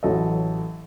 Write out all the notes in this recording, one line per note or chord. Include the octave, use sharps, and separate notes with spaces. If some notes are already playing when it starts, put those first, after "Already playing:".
A1 F#3 A4 D#5